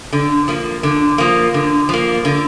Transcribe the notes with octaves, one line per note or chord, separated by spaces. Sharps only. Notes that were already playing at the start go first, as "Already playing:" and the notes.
D3
F3 A#3
D3
F3 A#3
D3
F3 A#3
D3